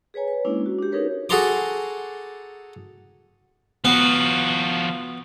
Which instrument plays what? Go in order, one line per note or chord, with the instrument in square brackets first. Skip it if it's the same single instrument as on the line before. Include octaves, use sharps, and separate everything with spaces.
[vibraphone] G#4 B4 C#5 G#5 A#5
B4
G#3 A#3 C#4 D4 E4
F#4
D4 G4
C#4 D#4 G#4 A#4 B4 C#5
[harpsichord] F#4 G#4 A4 A#5 C6 D6
[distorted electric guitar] F3 F#4 [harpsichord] B3